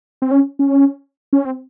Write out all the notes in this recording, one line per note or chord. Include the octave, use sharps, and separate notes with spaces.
C4
C#4
C#4
C#4
C4